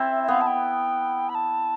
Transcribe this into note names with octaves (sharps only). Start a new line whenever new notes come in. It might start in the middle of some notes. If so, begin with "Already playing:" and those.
Already playing: C4 E4
E5
E5
B3 F5
A5
G5
B5
A5